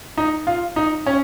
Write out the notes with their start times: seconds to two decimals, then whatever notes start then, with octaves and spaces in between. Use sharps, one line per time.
0.18 D#4
0.47 F4
0.76 D#4
1.06 C#4